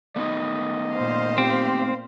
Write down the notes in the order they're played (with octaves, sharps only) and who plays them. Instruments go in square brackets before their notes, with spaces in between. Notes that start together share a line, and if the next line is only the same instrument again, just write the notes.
[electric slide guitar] A3 B3 D#4 [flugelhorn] D#5
[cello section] A#2 C5 F5
[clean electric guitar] C4 [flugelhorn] G4